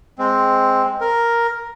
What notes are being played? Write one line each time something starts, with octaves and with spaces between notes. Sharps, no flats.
G#3 C4
A#4